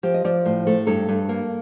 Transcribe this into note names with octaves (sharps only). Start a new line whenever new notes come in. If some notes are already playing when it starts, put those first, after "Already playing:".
F3 G4
D#5
F3 D5
A2 C5
A3 A4
G2 A4
G2
A#3